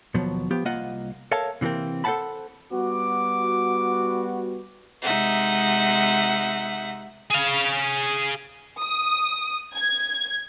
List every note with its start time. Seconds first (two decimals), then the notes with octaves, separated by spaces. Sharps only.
0.14 D#2 B2 F3 F#3
0.51 F3 B3 G4
0.65 C2 A#3 F4 D#5 F5 F#5
1.32 A4 A#4 C#5 E5 F5 A5
1.61 C3 E3 G#3 A#3 C4
2.04 A4 C5 E5 F#5 A5 B5
2.73 G3 B3 F#4 D6
5.02 C3 G#3 D#4 E5 F#5
7.30 G#4 F5
8.81 D#6
9.75 G#6